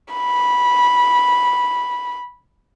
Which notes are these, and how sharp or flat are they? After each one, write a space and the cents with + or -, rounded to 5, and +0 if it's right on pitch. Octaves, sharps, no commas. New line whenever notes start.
B5 -10